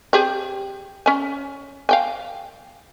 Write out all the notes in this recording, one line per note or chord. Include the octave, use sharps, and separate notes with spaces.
C4 G4 G#4
C#4 G#5
F5 G5 G#5